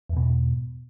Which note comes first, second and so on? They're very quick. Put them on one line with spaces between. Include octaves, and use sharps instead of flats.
E2 G#2 B2